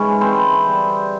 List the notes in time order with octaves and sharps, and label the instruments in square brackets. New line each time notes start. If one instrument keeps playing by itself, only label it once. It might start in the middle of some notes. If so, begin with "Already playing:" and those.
Already playing: [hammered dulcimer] G#2 E3 G#3 [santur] C#4
[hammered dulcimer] B3 E4 G4 [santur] C4 C5
[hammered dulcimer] D3 G3 B3